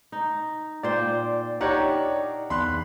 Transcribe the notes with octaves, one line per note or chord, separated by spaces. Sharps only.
D#4
A#2 C5 D5 G5
D4 D#4 G4 A#4 C#5 F#5
E2 B5 C6 F#6